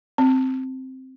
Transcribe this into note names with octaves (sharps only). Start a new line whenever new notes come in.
C4